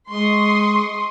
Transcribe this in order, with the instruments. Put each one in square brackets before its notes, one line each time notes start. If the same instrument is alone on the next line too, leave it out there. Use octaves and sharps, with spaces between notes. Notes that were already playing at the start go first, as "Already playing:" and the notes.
[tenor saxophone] G#3 [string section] C6 C#6 D#6